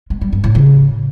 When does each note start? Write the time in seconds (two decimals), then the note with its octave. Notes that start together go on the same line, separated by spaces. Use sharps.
0.10 G#3
0.21 G3
0.33 G2
0.44 A2
0.55 C#3